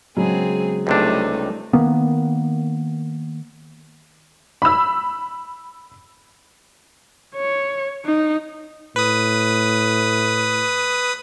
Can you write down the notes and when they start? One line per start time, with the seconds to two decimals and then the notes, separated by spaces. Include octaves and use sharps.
0.17 C#3 F#3 G#3 B3 C4 G#4
0.87 C#2 C3 G3 A3 D4 D#4
1.73 D#3 A#3 B3
4.62 B5 E6
7.35 C#5
8.05 D#4
8.96 A2 B4 D#6